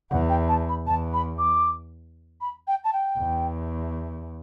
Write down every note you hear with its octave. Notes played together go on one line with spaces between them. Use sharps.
E2 F#5
G5
A5
B5
E2 A5
B5
D6
B5
G5
A5
G5
E2